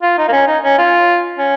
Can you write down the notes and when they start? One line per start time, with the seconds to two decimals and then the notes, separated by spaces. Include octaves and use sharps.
0.02 F4
0.18 D#4
0.28 A#3
0.32 C#4
0.47 D#4
0.64 C#4
0.78 F4
1.38 C#4